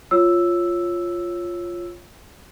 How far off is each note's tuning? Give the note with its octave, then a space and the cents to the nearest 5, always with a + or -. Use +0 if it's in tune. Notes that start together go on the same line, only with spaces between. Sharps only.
F4 +0 C#5 -5 E6 +0